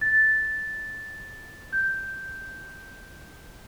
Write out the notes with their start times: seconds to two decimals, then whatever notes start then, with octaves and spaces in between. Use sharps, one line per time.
0.01 A6
1.73 G6